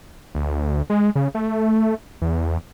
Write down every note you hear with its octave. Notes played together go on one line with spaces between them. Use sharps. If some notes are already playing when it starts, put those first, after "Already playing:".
D2
G#3
C#3
A3
E2